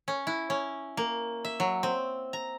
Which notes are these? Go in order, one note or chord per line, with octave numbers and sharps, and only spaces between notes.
C#4
E4
C#4
A#3
E5
F#3
C4
A#5